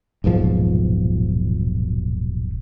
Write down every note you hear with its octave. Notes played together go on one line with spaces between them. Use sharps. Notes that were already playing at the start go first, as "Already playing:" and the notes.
D#1 B1 G#2 F3